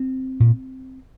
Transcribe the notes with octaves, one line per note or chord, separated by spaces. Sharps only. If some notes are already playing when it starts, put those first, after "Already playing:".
Already playing: C4
A#2